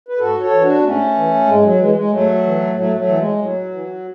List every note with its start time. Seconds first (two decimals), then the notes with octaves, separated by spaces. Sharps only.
0.09 B4
0.19 G#2 F#4 A4
0.40 A4 C#5
0.51 E3
0.61 D4 F#4
0.78 B3
0.83 G#2 A3 C#4
1.15 E3
1.47 G#2 G#3
1.63 F#3
1.79 E3 G#3
1.94 G#3
2.11 G#2 F#3 A3
2.44 E3
2.75 A2 F#3 A3
2.96 F#3 A3
3.07 E3
3.18 G#3
3.38 A2 F#3
3.71 E3